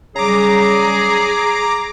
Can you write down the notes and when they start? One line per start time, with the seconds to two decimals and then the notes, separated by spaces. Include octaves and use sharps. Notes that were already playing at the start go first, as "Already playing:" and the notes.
0.16 C#3 F#3 G3 G#4 A#5 D6